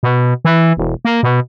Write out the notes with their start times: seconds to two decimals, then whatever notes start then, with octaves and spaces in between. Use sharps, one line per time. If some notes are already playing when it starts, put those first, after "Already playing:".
0.03 B2
0.45 E3
0.77 E1
1.05 A#3
1.23 B2